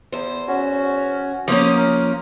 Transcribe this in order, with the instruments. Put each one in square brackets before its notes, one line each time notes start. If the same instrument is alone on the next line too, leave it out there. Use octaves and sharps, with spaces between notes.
[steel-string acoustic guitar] E2 C5
[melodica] C#4 F#4
[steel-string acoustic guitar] F3 A#3 C#4 [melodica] D6 D#6
[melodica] A#4